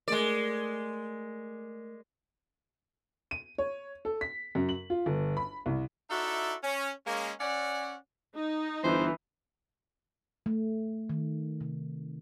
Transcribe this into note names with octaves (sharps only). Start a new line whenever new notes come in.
G#3 A3 G#4 A#4 D5
D#7
C#5
A4
B6
F#2
F#7
F4
G1
B5
C2
D#4 E4 F#4 A4 D5 E5
C#4
G#3 A#3 C#4
C#4 D5 F#5
D#4
G1 E3 C5
A3
D#3
C3